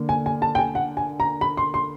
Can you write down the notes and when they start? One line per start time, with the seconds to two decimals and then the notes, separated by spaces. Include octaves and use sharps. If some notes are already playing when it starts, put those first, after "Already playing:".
Already playing: D3 A#3
0.09 G#5
0.26 G#5
0.42 A5
0.55 G5
0.59 G#5
0.75 F#5
0.97 G#5
1.20 A#5
1.41 B5
1.57 C6
1.74 C6